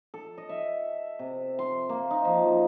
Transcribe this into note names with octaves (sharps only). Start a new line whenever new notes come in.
A4
D#5
E5
C3
C6
A#3
D#4
F3
F#2